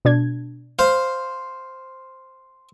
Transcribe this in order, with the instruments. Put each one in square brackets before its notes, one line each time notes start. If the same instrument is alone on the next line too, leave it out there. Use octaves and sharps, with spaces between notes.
[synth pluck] B2 D4 G#6
[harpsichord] C5 F5